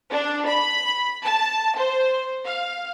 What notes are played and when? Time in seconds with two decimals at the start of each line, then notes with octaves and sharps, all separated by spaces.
0.11 D4
0.47 B5
1.25 A5
1.77 C5
2.46 F5